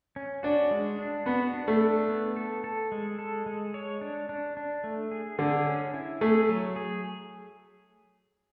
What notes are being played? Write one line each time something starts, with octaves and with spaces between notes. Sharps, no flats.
C#4
D4 F#4
G#3
D4
B3 F#4
D4
A3
D4
B3
A4
A4
G#3
A4
G#3
C#5
D4
D4
D4
A3
G#4
D3 G#4
C#4
E4
A3 G#4
F#3
G#4